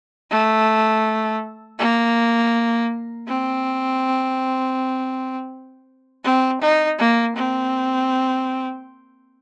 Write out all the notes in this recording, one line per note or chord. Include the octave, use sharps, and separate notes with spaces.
A3
A#3
C4
C4
D#4
A#3
C4